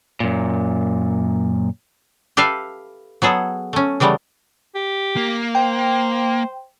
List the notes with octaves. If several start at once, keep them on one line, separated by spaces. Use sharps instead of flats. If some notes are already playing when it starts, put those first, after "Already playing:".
F#2 A#2
G4 A4 B4 E5 F5
F#3 B3 G#4 A4
A3 C#4
C#3 E3 G3 A3 B3
G4
A#3
C5 G5